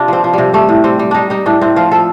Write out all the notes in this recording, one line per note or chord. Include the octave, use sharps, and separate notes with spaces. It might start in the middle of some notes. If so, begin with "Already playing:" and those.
Already playing: C3 D4 F4
F3 C4
F3
C3 G3
G3 A3
A2
G3 C4
G3
G3 D4 D#4
G3 D#4
A2 D4
A2 C4
F3 F4
F3 A4